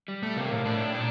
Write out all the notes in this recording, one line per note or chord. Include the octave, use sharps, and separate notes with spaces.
G3
A3
C3 A#3
A2
A2 D4
A#2 D4